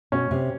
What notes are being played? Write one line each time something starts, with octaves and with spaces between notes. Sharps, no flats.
B2 C#4
C3